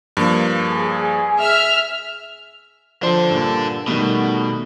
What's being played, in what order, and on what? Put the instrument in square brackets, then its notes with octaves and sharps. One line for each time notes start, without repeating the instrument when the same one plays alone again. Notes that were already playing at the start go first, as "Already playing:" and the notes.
[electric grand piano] G2 F3 A#3
[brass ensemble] G#4
[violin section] E5 F6
[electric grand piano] F3 C5 C6 [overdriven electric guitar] D4 A4
[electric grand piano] G2 A#2
[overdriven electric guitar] B2 [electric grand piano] D#3 G3 A3